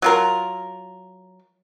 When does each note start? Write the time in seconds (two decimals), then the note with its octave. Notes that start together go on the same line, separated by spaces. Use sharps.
0.02 F#3 F4 A#4